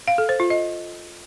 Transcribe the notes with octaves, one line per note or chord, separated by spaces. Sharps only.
F5
A4
C5
F4
D#5